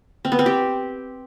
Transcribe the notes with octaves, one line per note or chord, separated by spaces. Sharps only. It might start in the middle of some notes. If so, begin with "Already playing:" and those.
C4
B3
C4
G4